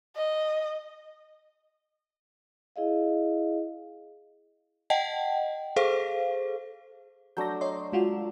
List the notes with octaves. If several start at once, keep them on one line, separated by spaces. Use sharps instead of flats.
D#5
E4 G#4 D#5 F5
D#5 F#5 G5 A5
G#4 A4 C5 F5
F#3 A3 D4 G6 A#6
C#5 D#5 C6
G#3 F4 F#4